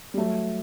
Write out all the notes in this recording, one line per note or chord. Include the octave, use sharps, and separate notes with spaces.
G3
F#3 A3